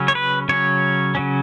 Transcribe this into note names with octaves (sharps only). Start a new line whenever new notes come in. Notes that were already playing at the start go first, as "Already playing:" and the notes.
Already playing: C#3 F#3 C#4
C#5
B4
C#3 F#3 C#4 C#5
C#3 F#3 C#4